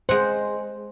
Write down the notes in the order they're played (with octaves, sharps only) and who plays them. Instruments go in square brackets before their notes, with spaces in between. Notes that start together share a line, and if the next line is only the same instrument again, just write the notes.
[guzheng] G#3 F#5 [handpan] C5